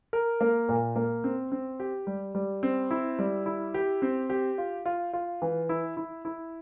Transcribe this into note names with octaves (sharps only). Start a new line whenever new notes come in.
A#4
A#3
A#2
A#3
C4
C4
G4
G3
G3
C4
E4
G3
E4
G4
C4
G4
F4
F4
F4
E3
E4
E4
E4